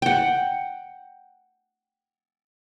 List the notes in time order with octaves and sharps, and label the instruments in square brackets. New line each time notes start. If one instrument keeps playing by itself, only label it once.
[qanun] F#5 G5